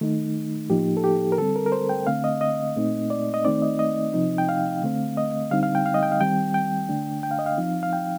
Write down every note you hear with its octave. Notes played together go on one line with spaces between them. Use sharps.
D#3 A3 D#4
A2 F3 A#3 D#4 G4
A4
G4
A#4
D3 G3 C4 A4
A#4
A#4
C5
G5
D3 A3 C4 F5
D#5
D#5
A#2 A3 C4 D#4
D5
D#5
D#3 A3 C4 D#4 D5
D#5
D#5
C3 F3 C4 D#4
G5
F5
D3 A3 C4
D#5
D3 G3 C4 D#4 F5
F5
G5
F5
D#5
G5
F5
D#3 G3 C4 G5
G5
D3 A3 D4
G5
F5
D#5
F5
F3 C4 D#4
F5
G5